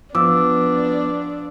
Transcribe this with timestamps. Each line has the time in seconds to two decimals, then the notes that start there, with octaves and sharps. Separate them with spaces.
0.15 F3 B3 D4 D6 E6